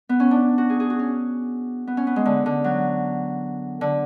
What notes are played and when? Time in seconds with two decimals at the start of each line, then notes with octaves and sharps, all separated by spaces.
0.09 B3
0.20 C#4
0.31 D4
0.58 F#4
0.70 G#4
0.80 G#4
0.90 F#4
0.99 C#4
1.87 B3
1.97 C#4
2.07 B3
2.16 G#3
2.26 D3
2.46 D3
2.64 F#3
3.81 D3